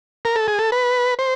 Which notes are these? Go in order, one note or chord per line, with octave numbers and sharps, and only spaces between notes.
A#4
A4
G#4
A4
B4
C5